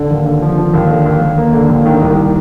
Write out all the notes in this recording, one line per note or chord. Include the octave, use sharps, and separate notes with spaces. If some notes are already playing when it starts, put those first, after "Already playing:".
Already playing: D3
D#2
D3
F3
F3
D#2
D3
D#2
D#2
A#3
D3
D#2
D#3
C2